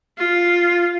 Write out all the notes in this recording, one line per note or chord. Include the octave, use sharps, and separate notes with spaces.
F4